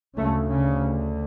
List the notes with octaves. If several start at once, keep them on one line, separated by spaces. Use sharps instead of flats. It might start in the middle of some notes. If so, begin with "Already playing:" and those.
D2 C#3 A3
C#3